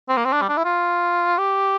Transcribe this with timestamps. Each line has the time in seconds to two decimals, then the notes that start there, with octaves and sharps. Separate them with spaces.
0.09 C4
0.17 A#3
0.25 C4
0.32 D4
0.41 G3
0.49 D4
0.57 E4
0.65 F4
1.38 G4